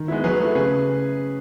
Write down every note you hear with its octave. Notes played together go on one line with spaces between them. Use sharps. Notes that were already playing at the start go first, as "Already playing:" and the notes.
Already playing: D#3
G#3 B3 E4
F#3 G#4 B4
A3 E4
C#3 G#4 B4